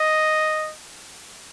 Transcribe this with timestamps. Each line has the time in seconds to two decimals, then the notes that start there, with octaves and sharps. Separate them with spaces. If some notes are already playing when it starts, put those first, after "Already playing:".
Already playing: D#5